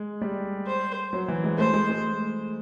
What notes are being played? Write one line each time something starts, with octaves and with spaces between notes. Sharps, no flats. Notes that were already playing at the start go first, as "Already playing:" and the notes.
Already playing: G#3
G3
C5
F#3
E3
G#3
A3 C5
G#3
G#3